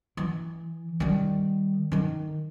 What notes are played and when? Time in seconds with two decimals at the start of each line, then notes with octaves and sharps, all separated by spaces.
0.17 E3
1.00 D#3 G3
1.92 D#3 D#4